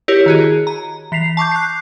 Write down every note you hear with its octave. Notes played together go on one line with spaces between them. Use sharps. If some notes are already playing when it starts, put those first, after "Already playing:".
E4 G4 A#4 C#5
D#3 F#4 G#4
A#5
E3 B6 C7 F7
A5 C#6 D6 G6
F#6 C7